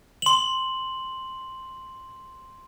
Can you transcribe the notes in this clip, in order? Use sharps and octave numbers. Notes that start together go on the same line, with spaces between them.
C6 F#7